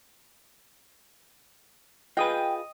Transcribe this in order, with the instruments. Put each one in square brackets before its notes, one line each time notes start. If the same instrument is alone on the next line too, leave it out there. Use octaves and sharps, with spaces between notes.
[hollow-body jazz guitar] F4 G#4 B4 [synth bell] D#5 D#6 D#7 [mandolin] G5